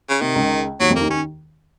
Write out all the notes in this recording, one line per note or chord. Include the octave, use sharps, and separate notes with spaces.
C#3
C3 D#3
C#2 C#3
D#2 D#3 F#3
F2 F3
D#2 D#3 A#3
D#3 C#4